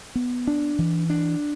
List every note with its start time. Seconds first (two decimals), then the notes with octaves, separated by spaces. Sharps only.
0.15 B3
0.47 D4
0.79 E3
1.10 D4